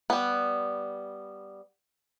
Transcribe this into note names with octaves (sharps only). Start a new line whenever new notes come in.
G3 B3